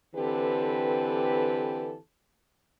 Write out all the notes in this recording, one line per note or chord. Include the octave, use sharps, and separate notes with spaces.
D3 E3 C4 G4 A4 B4